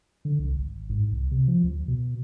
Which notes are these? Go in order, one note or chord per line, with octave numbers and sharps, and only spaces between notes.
D3
C2
G#1
G#2
C2
C3
F3
D2
B2